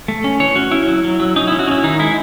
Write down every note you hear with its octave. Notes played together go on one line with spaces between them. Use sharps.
A3
C#4
E3 C#5
C#4 F#4
C#4 E4
F#3
F#3
F#3
C#4 D#4
C#4 E4
F#4
C#4 E4
D#3 D#4
G#3 E4